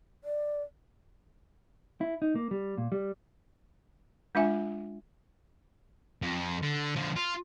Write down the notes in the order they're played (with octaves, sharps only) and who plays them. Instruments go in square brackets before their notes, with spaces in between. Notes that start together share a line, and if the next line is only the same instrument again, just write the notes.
[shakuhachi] D5
[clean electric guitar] E4
D#4
A#3
G3
A#2
G3
[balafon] G#3 D4 F4 E5 G#5
[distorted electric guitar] F2
D3
D3 F3
F4